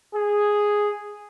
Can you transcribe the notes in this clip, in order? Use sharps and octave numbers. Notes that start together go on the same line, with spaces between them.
G#4